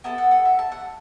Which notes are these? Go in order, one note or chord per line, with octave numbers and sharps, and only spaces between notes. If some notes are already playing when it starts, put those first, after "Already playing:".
B3 E4 A4 A5
F#5
F#5
E5
A5
F#5